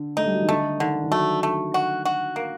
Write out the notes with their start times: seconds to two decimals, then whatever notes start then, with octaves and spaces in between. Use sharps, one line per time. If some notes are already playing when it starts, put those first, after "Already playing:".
Already playing: D3
0.17 A3 D#4
0.26 G3
0.33 F#3
0.41 D#3
0.48 D3 A3
0.80 D3 D#3
1.03 D#3
1.11 F#3 A3
1.43 A3
1.74 F#4
2.05 F#4
2.36 A#3